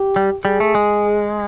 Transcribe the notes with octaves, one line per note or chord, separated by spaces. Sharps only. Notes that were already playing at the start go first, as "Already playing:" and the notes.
Already playing: G4
G3
G3 G#4
A3
G#3